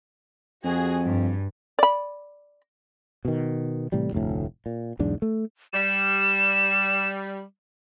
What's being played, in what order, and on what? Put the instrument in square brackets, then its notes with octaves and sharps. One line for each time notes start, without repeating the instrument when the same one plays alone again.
[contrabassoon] F2 [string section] F#4 G#4
[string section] G2
[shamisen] D5 B5
[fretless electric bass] B2 D#3
A2 C3 E3 G3
F1 D2 A2
A#2
B1 E2 G#2 D4
A3
[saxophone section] G3 [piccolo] E7